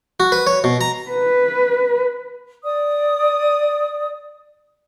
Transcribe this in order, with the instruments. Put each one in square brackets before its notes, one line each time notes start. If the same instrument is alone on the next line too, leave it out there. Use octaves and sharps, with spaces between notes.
[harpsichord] F#4
B4
C#5
B2
A#5
[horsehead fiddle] B4
[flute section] D5 D#6